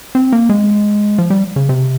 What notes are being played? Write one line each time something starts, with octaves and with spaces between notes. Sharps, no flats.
C4
A#3
G#3
F3
G3
C#3
C3